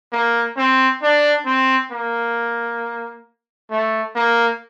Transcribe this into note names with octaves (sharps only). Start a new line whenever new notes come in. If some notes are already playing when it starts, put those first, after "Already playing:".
A#3
C4
D4
C4
A#3
A3
A#3